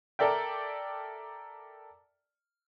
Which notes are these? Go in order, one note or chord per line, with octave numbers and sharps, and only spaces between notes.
A4 A#4 D5 E5 G5